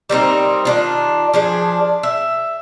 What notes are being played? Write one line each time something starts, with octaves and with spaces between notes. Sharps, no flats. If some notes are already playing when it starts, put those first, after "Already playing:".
G3 A#3 C4 D#4
D#3 D4 F4
F3 D4 G#4
E5